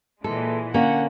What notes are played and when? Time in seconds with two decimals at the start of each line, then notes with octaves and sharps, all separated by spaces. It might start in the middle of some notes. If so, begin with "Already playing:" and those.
0.24 A#2 E3 G#3 A4
0.74 D3 A#3 C#4 F#5